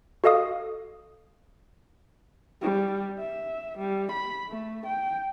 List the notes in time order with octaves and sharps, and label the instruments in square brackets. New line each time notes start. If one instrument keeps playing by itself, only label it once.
[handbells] F#4 A4 D#5 F5 D#6
[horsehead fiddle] G3
E5
G3
B5
A3
G5